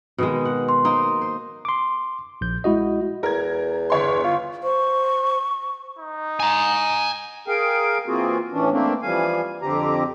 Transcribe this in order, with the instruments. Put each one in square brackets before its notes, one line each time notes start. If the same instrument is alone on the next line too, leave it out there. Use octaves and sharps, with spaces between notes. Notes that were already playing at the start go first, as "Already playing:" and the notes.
[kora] B2 D#3 G#3
F#5
[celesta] C6
[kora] A#3 D#4 C5
C5
[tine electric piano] C6 D6
A#1 G6
G#3 E4 F#4 D#5
[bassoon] E2 [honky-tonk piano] A#4 G#6
[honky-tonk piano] G1 C#5 C6
[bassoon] F4
[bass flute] C5 [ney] C#6
[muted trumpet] D#4
[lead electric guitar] G#5 A#5
[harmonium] G#4 A#4 F5 G5
E3 A#3 C4 F4 F#4 G#4
A2 E3 C#4 D4
A3 A#3 C4 D4
E3 F3 G3 F5 G#5
F2 D3 C4 G4 A#5